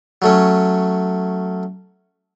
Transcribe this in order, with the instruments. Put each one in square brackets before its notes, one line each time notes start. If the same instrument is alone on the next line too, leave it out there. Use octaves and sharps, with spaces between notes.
[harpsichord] F#3 A3 C#4